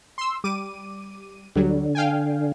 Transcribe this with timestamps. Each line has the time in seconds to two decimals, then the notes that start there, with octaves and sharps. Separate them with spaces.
0.18 C6 E6
0.44 G3 D6 D#7
1.56 D2 D3 F#3 G3
1.95 F5 G5 G#5